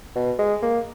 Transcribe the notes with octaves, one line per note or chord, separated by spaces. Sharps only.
B2
G#3
A#3